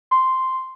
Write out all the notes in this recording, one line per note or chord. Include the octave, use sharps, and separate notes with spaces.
C6